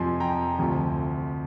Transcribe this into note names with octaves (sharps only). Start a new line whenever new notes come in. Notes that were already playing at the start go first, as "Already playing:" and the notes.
Already playing: F2 C3 F3 G#5 C6
G5 A#5
D2 C3 F3